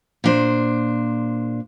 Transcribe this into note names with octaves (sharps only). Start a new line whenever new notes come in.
A#2 D4 C5